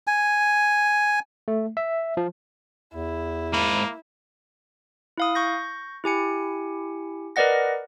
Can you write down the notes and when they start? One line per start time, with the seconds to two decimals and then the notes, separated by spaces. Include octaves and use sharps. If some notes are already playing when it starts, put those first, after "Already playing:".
0.07 G#5
1.48 A3
1.77 E5
2.17 F3
2.94 E2 E4
3.53 G#2 A#3 B5
5.18 E4 F5 D#6
5.35 C#6 G6 A#6
6.04 E4 G4 G#5 C#7
7.36 A#4 B4 D5 D#5 F#5 A#6